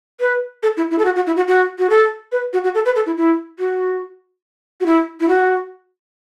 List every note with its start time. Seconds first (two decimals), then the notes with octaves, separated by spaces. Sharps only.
0.21 B4
0.63 A4
0.77 E4
0.91 E4
0.99 A4
1.05 F#4
1.16 F#4
1.27 E4
1.36 F#4
1.48 F#4
1.79 F#4
1.90 A4
2.32 B4
2.53 F#4
2.64 F#4
2.75 A4
2.85 B4
2.96 A4
3.06 E4
3.17 E4
3.59 F#4
4.81 F#4
4.86 E4
5.20 E4
5.29 F#4